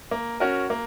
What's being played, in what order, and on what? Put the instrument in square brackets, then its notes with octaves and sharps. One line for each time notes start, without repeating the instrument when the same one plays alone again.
[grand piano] A#3
C#4 F#4 A#4
A#3